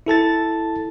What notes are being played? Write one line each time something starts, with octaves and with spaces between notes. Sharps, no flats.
E4 A4 A5 A6